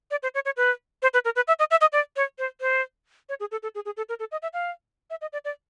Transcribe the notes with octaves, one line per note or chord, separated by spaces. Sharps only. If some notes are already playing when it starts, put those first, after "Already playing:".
D5
C5
C#5
C#5
B4
C5
B4
A#4
B4
E5
D#5
E5
D#5
D5
C#5
C5
C5
C#5
G#4
A4
A4
G#4
G#4
A4
A#4
A4
D#5
E5
F5
E5
D#5
D5
D5